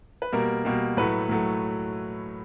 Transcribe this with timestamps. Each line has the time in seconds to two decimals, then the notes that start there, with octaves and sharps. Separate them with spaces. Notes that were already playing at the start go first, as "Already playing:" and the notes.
0.22 B4
0.32 B2 G3 A#3 A#4
0.65 B2 G3 A#3
0.97 A2 F#3 A3 B4
1.29 A2 F#3 A3